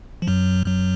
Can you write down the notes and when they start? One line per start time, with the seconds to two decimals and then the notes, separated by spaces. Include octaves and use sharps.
0.22 F3
0.27 F#2 F#3
0.66 F#2 F#3